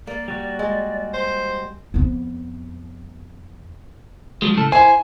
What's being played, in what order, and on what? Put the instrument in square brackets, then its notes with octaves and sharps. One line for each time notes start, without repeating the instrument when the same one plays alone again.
[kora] A#3 [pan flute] D5
[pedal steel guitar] G3 F#4
[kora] G#3
[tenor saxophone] C5
[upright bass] F2 B3
[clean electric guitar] F3 F#3 G#3
A2 C#3 A4
[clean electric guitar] E4 C5 [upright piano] G#5